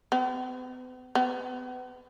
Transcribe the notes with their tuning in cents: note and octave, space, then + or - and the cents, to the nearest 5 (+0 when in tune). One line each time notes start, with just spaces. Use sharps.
B3 +45
B3 +30